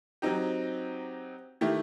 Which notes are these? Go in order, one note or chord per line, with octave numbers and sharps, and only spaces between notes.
F#3 C4 D#4 G4
D#3 A3 E4 G4